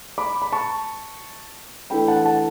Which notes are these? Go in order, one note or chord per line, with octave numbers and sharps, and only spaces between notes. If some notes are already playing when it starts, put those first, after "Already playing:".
B5 D6
B5
A5 C#6
E3 A3 D4 G5 B5
F#5 A5
F#5 A5